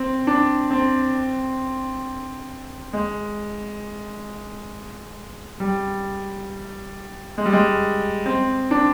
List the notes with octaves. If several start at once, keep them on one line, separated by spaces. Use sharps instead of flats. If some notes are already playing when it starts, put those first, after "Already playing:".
Already playing: C4
D4
C4
G#3
G3
G#3
G3
G#3
C4
D4